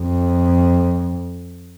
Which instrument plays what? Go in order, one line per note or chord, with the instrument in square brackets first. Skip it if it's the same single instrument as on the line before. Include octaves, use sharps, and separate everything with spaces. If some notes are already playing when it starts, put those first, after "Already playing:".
Already playing: [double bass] F2